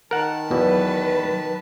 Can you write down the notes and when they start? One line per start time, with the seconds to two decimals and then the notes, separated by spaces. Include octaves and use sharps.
0.11 D#3 A#4 F#5 A5
0.51 E2 B2 F#3 B4